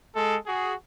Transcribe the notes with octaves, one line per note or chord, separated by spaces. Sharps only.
G#3 A4
F#4 G#4